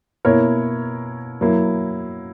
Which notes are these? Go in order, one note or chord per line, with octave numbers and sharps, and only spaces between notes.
B2 A#3 E4 A#4 C#5
F#3 A#3 E4